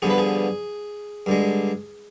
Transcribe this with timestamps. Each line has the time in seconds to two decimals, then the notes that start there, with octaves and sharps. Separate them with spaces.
0.02 G2 D3 F3 B3 G#4
0.10 B4
0.18 G#4
1.26 G2 D3 G#3